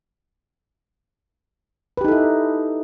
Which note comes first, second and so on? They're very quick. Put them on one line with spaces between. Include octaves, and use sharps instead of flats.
B4 G4 D#4 A4 E4